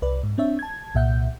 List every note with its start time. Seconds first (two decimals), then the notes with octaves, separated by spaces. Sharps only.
0.02 C2 B4 D5
0.23 G#2
0.38 C4 D4 C#5 E5
0.59 A5 G#6
0.95 C2 A#2 E5 F#5 G6